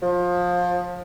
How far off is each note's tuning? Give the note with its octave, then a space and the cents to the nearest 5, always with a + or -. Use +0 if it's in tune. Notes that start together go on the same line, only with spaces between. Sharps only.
F3 +25